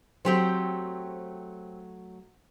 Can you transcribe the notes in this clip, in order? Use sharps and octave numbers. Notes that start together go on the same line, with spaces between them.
F#3 A3 C4 G4 C5